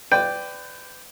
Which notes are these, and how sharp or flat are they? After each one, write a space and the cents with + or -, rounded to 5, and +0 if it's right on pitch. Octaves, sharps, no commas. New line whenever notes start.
B4 +30 D5 +0 G5 +0